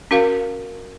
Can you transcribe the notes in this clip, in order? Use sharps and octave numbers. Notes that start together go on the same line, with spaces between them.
C#4 F#4 A#4 F5